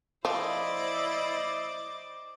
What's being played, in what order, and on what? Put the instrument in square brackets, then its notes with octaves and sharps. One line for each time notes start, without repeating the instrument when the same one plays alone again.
[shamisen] F3 [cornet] E4 [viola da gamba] C5 D5 D#5 [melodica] D6